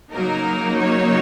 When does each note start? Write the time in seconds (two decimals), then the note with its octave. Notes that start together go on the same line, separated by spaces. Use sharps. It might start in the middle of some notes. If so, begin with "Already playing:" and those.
0.12 C#3 F#3 A#3 D#4 A#4
0.78 C#5